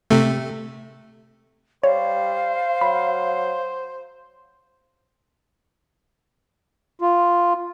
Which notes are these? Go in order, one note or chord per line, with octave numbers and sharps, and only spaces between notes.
C3 A3
G3 C5 C#5 F5
F#3 B5
F4